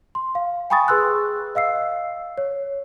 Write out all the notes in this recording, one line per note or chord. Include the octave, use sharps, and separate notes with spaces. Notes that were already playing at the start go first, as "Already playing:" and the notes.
C6
F5
G5 G#5 B5 C#6 D#6 A6
G#4 B4 C6 E6 F#6
D#5 F5 E6 C7
C#5